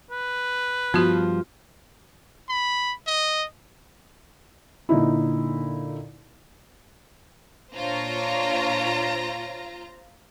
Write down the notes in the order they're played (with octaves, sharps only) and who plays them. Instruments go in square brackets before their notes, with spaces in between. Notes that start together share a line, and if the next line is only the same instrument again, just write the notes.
[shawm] B4
[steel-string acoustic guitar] G2 F3 [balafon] B3 F#4 [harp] F4
[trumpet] B5
D#5
[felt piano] A#2 D3 D#4 E4
[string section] A#2 D4 C#5 [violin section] F4 C5 A#5